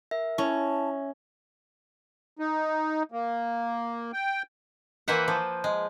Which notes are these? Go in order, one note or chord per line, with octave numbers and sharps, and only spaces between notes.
A#4 E5
C#4 E4 A5
D#4
A#3
G5
E3 A#3 B4 C5 E5 F#5
F3
G#3